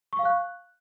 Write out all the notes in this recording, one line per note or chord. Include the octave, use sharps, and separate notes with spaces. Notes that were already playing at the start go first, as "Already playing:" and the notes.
C#6
F5
F#6